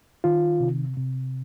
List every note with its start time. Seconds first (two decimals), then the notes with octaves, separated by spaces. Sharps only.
0.24 D#3 F4
0.60 C3
0.97 C3